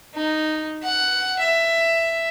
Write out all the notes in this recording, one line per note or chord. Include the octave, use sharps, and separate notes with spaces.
D#4
F#5
E5